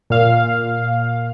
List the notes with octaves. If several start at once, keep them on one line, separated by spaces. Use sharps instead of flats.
A#2 F5